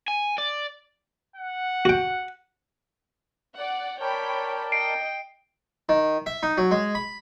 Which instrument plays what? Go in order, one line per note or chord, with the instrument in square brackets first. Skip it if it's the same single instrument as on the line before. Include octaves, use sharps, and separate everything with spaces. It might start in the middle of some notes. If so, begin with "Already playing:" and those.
[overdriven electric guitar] G#5
D5
[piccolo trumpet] F#5
[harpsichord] F#4 G5
[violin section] D5 F#5
[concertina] A#4 D5 A5 [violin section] C#5 G5 B5
[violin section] D#5 G5 [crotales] C7 D7
[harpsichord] D#3
E5
D#4
F#3
G#3
B5